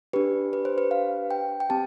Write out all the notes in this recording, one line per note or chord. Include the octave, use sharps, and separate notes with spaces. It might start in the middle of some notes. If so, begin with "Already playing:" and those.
D4 G4 B4
B4
C5
B4
F5
G5
G5
C4 G4 A5